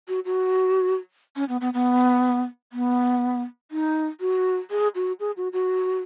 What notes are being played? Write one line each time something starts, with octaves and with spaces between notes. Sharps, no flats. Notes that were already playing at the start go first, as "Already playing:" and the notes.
F#4
F#4
C#4
B3
B3
B3
B3
D#4
F#4
G#4
F#4
G#4
F#4
F#4